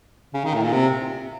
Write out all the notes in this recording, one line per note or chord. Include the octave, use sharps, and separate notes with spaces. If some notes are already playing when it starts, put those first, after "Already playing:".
C#3
D#3
A2
A#2
C3